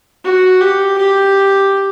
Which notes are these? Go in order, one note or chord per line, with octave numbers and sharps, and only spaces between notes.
F#4
G4
G4